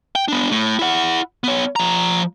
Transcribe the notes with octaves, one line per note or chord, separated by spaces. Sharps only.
G5
B3 D4
A2
E4 F#5
B3 C#5
F3 A#5